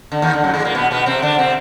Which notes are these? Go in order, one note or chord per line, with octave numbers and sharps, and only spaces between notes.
D3
D#2 D#3
D3
F#2 F#3
G#2 G#3
A#2 A#3
B2 B3
B2 B3
C3 C4
D3 D4
C3 C4